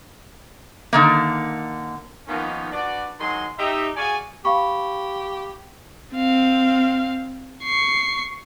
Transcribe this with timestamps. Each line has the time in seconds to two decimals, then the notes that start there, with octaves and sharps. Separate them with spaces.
0.93 D3 D#3 A#3
2.28 D#3 F3 A#3 B3 C#4 D#4
2.71 D4 F#4 B4 D5
3.20 D#3 F#3 G#3 C6
3.58 D#4 G4 E5
3.96 F#4 G#4 D5 F5 G#5
4.45 G4 F5 B5 C#6
6.15 C4 F5
7.64 C#6 C7